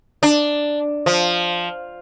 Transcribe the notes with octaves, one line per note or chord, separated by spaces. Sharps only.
D4
F3